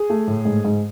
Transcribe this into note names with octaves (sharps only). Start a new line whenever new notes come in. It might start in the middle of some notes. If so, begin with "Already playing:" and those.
Already playing: G#4
A3
A2
G#2
G#2